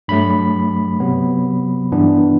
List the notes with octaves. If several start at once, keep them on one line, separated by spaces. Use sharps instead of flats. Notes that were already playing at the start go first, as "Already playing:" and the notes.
G2 F#3 A3 B5
C3 F#3 B3
G2 E3 B3 D4